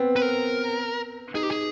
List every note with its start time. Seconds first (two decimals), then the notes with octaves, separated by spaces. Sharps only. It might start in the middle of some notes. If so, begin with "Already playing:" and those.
Already playing: B3 C4
0.16 B4
0.22 A#4
1.34 D#4 G#4
1.43 G4
1.51 G#4